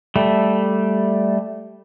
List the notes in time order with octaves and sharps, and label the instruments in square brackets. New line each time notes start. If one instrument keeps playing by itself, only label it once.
[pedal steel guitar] G3 A3